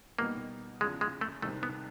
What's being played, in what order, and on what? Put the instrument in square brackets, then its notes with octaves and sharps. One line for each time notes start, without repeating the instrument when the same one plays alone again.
[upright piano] B2 G3 B3 D#4 [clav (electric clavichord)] A#3
[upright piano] E2 C#3 F3 [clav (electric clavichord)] G#3
[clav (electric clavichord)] G#3
A3
[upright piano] C2 C3 D#3 G3 C4 [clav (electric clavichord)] A3
[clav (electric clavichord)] B3